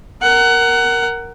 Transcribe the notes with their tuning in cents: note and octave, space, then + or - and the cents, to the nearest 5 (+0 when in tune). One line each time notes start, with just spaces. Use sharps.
A#4 +0 F#5 +20